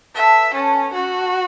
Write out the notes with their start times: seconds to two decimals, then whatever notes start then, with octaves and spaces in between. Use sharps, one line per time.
0.15 B3 A4 E5 F#5 A5
0.54 B3 C#4 A4 F#5 A5
0.93 A3 C#4 F#4 A4 F#5